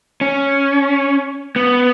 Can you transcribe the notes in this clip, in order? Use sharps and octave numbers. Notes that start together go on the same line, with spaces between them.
C#4
B3